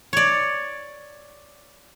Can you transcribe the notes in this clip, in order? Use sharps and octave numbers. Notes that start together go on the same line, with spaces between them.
C#5 D5